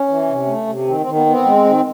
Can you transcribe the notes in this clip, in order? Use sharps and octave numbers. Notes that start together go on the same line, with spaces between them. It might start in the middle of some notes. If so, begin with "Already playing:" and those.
Already playing: C#4
E3
C3
A3
C3
D#3 C4
C4
D#3
B3
B3 C4
G#3
D#3